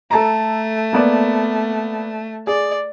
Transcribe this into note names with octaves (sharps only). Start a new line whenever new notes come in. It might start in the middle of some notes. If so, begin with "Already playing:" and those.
A3 A4 A5 A#5
A#3 B3 D5
G#4 D5